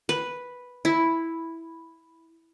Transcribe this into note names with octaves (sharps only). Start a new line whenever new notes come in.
B4
E4